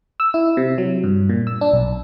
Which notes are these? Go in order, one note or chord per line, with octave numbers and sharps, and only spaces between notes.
E6
E4
C3
F#3
G2
A#2
E6
D4
B1